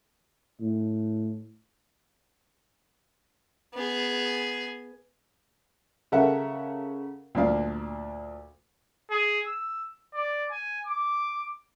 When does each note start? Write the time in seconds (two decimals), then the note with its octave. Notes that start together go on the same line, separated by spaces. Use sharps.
0.61 A2
3.74 B3 G#4
6.12 C#3 A4 A#4 E5 F#5
7.35 D2 A#2 D4 F5
9.10 G#4
9.46 E6
10.14 D5
10.51 G#5
10.87 D6